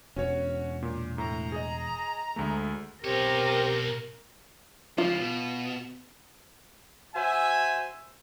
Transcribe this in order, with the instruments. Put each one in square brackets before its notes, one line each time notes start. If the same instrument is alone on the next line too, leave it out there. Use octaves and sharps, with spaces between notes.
[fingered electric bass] E1 [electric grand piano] C#4 F#4 C#5
[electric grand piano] A#2
[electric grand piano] A2 [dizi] A#5
[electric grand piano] G#4 D#5
D2 G#3 A3
[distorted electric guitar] B2 C#5 [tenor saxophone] C4 [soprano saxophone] G4 [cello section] A#4
[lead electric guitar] C#2 F3 [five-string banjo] F4
[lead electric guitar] B2
[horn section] F#4 C5 E5 G#5